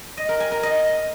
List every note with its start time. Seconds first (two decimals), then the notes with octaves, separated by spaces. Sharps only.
0.17 D#5
0.29 A#4
0.40 G#5
0.52 A#4
0.63 D#5